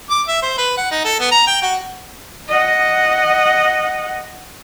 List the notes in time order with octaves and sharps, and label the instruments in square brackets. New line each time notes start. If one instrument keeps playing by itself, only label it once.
[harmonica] D6
E5
C5
B4
F#5
D#4
A4
B3
A#5
G5
F#4
[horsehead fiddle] D#5 F#5